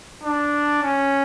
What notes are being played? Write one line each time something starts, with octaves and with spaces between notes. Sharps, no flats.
D4
C#4